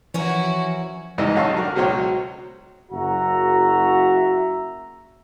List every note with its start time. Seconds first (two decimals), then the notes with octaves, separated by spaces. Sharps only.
0.14 E3 F3 C#4 E4 F#4 A#4 C#5
1.18 E2 G#2 E3 G3 D#5 E6
1.35 B1 C#4 D#4 F5 A5 C#6
1.57 D#3 D4 F#4 A#4
1.75 C#2 B2 F#3 C5 C#5
2.91 F#1 F#4 E5 A#5